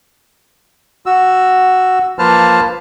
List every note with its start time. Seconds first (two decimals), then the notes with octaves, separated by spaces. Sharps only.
1.06 F#4 E6
2.19 F3 A#3 B4 C5 A5 F6